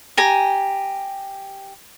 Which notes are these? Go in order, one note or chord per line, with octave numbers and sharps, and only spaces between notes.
G4 G#5 A#5